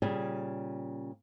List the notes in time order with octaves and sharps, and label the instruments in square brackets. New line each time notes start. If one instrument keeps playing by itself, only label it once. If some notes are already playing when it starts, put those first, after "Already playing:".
[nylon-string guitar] A#2 C#3 G3 G#4